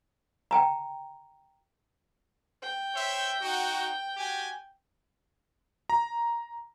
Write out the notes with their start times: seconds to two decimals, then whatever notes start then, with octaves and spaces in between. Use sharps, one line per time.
0.51 G5 A5 A#5
2.62 G5
2.95 C5 C#5 E5
3.41 D#4 F#4
4.17 F#4 G4 G#5
5.90 A#5